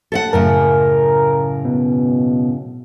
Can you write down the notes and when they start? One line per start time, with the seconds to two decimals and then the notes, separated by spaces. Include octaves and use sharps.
0.12 A4 F5 F#5 A5
0.33 F#2 A2 C#3 A#4
1.65 B2